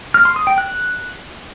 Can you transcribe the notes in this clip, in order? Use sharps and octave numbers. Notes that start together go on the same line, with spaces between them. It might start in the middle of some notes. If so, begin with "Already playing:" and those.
F6
C6
D#6
G5
F#6